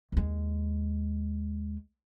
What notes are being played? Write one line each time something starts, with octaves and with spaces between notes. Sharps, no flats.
D#2 G#3